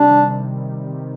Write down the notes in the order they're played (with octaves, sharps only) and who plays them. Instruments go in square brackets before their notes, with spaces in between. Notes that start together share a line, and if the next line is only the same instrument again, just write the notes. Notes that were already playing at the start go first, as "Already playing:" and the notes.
Already playing: [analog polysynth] C3 G3 [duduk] D4
[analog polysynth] D#3
C3
G3
C3
D#3